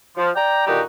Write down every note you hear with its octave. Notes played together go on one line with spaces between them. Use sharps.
F3
D5 G5 A#5
A#2 D3 D#3 D#4 F#4 G4